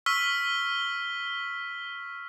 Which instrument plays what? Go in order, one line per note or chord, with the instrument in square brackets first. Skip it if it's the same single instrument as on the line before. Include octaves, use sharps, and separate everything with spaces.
[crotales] C#6 E6 F6 B6 G7